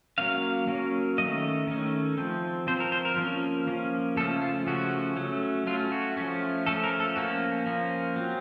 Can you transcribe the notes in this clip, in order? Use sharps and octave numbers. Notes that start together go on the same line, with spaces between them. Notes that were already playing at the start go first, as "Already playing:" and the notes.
F#3 A#3 C#4 F5
F#3 A#3 C#4
D#3 A3 C#4 D#5
D#3 A3 C#4
F3 C4
F3 C4 C5
A#4
C5
A#4
F3 A#3 C#4
F3 A#3 C#4
C#3 F3 A3 C#4 A4
F4
C#3 F3 A3 C#4 F#4
F#3 A3 C#4
F#3 A3 C#4 F4
F#4
F3 A3 C#4
F3 A3 C#4 A4
A#4
A4
F3 A#3 C#4 F#4
F3 A#3 C#4
F#3 C4